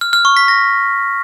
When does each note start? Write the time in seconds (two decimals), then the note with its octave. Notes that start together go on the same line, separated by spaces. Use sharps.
0.01 F6
0.13 F6
0.25 C#6
0.37 B6
0.48 A#6